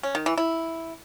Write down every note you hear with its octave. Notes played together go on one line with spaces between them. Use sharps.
C#4
D#3
E3
E4